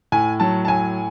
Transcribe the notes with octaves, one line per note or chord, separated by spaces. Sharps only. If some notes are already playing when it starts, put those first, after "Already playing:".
A2 G#5
F#3 A5
A5
A2 G#5